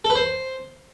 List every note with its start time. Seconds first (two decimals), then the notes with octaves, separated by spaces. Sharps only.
0.05 A4
0.10 B4
0.15 C5